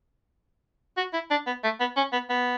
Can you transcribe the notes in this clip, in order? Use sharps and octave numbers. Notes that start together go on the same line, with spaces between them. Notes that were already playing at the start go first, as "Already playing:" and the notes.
F#4
E4
D4
B3
A3
B3
C#4
B3
B3